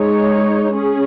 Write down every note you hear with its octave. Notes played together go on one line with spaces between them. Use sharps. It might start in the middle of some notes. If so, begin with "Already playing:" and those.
Already playing: G#3 D#4 C#5
C#4 G#4